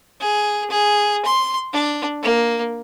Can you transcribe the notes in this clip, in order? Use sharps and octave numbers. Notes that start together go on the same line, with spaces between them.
G#4
G#4
C6
D4
A#3